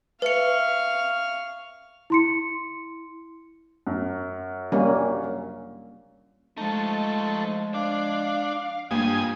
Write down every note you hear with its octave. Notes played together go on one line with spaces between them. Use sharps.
B4 E5 F5 C#6 F6 C#7
E4 C6 C#7
F#2
G3 A#3 C#4
F3 G#3 A3 D#4 F4
D4 F5
E2 G2 A#3 D4 F4 G#5 D#6